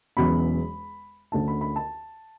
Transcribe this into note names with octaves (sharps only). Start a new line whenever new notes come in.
E1 E2 B2 F#3 C#4 B5
D2 D3 A3 C#4 A5
B5
B5
A5